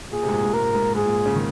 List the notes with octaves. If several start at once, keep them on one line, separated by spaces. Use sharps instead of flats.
A#2 G#4
C3
G#2
A#2
G#2
G#2 A#4
G#2
G#2 G#4
A#2
C#3
D#3